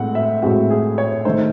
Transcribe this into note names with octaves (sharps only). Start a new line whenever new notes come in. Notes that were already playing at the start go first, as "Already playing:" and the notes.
Already playing: A2 G#3 C4 F#5
E5
A2 G#3 C4 F#4
G#4
C#5
D#3 A3 D#4 C5